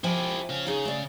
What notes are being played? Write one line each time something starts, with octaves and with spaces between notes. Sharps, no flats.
F3 E4 G4 G5 G#5
C#3 F5
C#3 D#4 G#4
A3 D5